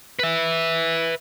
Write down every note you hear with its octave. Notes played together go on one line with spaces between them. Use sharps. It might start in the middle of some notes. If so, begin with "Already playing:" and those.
B4 E5